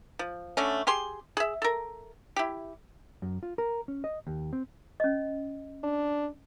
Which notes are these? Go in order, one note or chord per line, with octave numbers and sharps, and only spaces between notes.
F3
D3 A3 C#4
G4 G#4 C6
G#4 E5
A4 A#4
E4 G4
F#2
F4
A#4
C#4
D#5
D#2
C4
C#4 D#5
D4